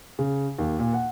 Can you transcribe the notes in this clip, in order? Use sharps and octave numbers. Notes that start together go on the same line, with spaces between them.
C#3
D#2
A#2
F#5